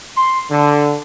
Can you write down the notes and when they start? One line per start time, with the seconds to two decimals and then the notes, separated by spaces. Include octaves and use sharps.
0.17 C6
0.51 D3